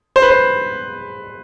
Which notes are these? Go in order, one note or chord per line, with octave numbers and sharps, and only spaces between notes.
C5
B4
C5